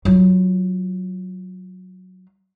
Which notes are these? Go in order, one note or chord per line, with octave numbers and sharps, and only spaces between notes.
F#3 F4